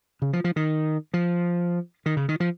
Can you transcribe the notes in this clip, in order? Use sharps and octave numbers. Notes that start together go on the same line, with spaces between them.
C#3
F3
F3
D#3
F3
D#3
C#3
D#3
F3